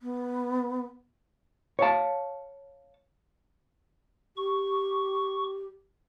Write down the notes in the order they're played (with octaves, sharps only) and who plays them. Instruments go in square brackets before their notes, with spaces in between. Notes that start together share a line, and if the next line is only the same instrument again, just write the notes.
[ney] B3
[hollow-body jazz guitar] C#5 F5 A5
[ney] G4 [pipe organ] C#6